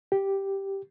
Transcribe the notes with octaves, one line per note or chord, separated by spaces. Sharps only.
G4